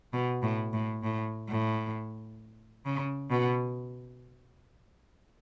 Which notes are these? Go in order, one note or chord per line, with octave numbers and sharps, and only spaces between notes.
B2
A2
A2
A2
A2
C#3
B2